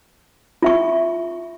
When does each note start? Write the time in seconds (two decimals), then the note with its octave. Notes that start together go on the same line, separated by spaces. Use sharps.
0.62 F4 E5 C#6